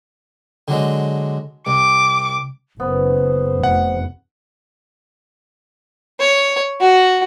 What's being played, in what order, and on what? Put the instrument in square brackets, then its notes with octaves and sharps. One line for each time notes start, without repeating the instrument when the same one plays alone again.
[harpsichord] D3 F#3 G#3
[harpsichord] C2 [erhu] D6
[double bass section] F#1 [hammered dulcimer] B3 [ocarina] C5
[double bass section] F1 [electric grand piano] F#5
[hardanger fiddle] C#5
F#4